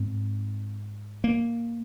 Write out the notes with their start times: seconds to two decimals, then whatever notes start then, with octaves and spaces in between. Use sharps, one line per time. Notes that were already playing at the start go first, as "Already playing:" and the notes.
Already playing: G#2 C4
1.24 A#3